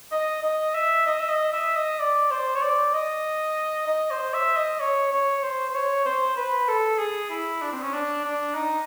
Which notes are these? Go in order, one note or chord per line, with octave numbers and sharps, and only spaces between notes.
D#5
D#5
E5
D#5
E5
D#5
E5
D#5
D5
C5
C#5
D5
D#5
D#5
C5
E5
D#5
C#5
C#5
C5
C5
C#5
C5
B4
A4
G#4
E4
D4
C4
C#4
D4
D4
D#4